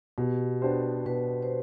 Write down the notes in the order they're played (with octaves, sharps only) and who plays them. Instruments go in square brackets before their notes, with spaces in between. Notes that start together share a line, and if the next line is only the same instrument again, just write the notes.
[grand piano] B2 [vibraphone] G4
[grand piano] B3 D4 G4 C5
[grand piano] B2 [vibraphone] B4
[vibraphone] C5